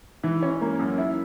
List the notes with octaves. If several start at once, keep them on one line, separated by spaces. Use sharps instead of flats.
E3
C#4
A#3
F#2
E4